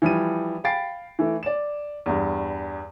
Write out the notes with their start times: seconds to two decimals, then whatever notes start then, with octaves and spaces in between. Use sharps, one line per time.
0.02 E3 F3 G3 D#7
0.64 F5 G5 B5 A6 C7 D7
1.19 E3 A3
1.43 D5 E7
2.06 E2 G2